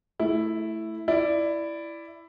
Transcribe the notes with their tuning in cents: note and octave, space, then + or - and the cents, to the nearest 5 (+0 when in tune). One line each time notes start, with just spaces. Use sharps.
A3 +0 E4 +0
E4 +10 D5 +0